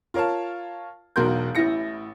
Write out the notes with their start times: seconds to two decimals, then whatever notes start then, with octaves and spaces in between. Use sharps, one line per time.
0.14 F4 A#4 C#5 F5 A5
1.16 E1 B1 F#4 A#4 C6 G6
1.55 A1 A2 E3 E4 A#6 C#7